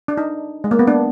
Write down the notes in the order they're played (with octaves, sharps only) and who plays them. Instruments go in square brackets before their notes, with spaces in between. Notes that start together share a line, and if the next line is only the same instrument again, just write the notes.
[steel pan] D4
D#4
G#3
A#3
B3
D4